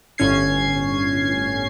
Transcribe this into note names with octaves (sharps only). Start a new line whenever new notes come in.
G1 A2 C#4 G#6 C7